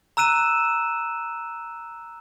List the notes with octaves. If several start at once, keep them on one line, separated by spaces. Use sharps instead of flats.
A#5 E6 F#6 D#7 E7